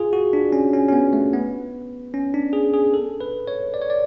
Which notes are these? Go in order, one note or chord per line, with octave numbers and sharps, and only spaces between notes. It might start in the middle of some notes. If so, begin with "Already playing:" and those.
Already playing: F4 G#4
F#4
D4
C#4
C#4
C#4
B3
A3
B3
C#4
D4
G#4
G#4
A4
B4
C#5
D5
C#5
D5